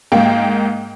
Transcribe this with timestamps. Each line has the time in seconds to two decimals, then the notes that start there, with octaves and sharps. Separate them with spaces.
0.12 G#2 A#3 G5